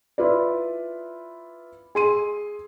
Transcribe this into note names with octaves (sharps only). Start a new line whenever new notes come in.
E4 F4 B4 D5
G#4 C6 D#7